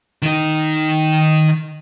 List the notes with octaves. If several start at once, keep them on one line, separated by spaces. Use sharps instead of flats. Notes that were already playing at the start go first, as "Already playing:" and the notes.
D#3 D#4